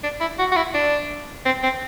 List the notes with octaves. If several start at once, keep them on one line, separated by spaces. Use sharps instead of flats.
D4
E4
F#4
F#4
E4
D4
C4
C4